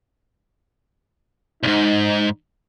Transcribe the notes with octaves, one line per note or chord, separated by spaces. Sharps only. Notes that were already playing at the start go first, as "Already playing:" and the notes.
C2 G#2 D#4